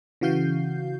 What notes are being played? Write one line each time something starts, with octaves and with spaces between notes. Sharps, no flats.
C#3 E3 F#4 F5 G6 C7